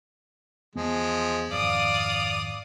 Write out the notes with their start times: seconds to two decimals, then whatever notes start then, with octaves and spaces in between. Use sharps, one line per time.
0.75 E2 F3 G#3 B3
1.52 G#1 F2 D5 F5 D#6